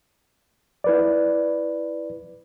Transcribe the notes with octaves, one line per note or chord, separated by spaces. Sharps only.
E4 B4 D5